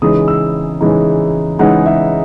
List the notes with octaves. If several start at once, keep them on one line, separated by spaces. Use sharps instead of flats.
C#3 E3 G#3 D#4 D#6
E6
C#3 E3 G#3 D#4
C#3 E3 G#3 D#4 F#5
E5